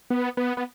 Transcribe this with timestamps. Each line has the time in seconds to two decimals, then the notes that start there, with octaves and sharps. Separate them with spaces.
0.10 B3
0.37 B3
0.57 B3